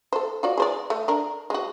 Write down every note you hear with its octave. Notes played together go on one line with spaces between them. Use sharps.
A4 C5
F4 F#4 D5
G#4 C5 D5
A3
D4 A#4
G#3 F#4